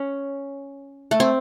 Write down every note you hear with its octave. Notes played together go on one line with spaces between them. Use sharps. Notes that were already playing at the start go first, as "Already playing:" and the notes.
Already playing: C#4
A3
C4